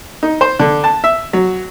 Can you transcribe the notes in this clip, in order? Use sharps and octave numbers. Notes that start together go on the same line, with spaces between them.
D#4
C5
D3
A5
E5
F#3